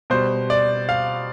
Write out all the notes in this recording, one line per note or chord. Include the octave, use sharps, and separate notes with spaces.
B2 G3 C5
D5
F5